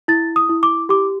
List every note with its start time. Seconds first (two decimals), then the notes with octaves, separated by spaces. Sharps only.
0.08 E4 A6
0.36 D#6
0.50 E4
0.63 D6
0.89 G4 D6